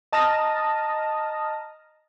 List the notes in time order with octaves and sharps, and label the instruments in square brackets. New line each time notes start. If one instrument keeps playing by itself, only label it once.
[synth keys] D#5 A5 A#5 D#6 F6 A#6